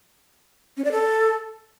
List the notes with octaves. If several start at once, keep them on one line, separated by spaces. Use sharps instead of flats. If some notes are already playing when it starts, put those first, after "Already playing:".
C#4
D5
A4